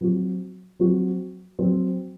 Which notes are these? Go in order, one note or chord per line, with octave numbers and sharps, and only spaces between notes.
F#3 C4 F#4
F#3 C4 F#4
F#3 C4 F#4